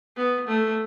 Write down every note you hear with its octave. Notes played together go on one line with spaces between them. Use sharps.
B3
A3